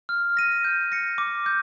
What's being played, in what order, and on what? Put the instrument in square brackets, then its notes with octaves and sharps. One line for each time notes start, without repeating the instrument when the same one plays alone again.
[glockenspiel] F6
A#6 D#7
G6
A#6 C#7
D6
G6